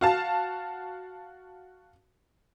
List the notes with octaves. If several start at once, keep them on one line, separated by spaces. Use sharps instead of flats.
F#4 F5 A5